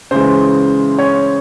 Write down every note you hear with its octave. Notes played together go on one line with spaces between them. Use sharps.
C#3 E3 G#3 C5
C#5